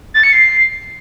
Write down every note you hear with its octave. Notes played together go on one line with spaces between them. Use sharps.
A6
C#7
C7